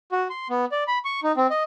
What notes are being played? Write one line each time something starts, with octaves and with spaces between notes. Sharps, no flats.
F#4
C6
B3
D5
B5
C#6
D#4
C4
D#5